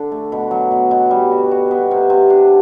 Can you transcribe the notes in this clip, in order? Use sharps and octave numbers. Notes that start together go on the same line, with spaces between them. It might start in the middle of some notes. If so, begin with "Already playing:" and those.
Already playing: D3 D4
A3
B2
F#3
B2
B2
G3
F#4
F#4
B3
C3
C3
D4